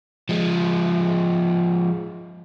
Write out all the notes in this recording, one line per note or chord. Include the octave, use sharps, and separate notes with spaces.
F3 G#3